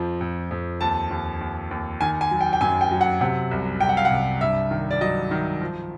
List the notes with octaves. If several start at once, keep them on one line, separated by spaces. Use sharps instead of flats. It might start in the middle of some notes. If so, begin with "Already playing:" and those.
Already playing: F2 F3
F2
F2
D#2 A5
D#2
D#2
D#2
D#3 G#5
G#5
F#3
G5
G5
F#2 G#5
G5
F#3
F#5
C3 F#5
C2
C2 G5
F#5
F5
F#5
C2
G2 E5
D#3
D5
F#3 D#5
D#3
F3